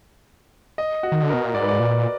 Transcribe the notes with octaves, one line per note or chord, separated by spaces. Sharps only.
D#5
F#4
D#3
D3
B2 A#4
A#2
G#2 D5
B4
D5
A#2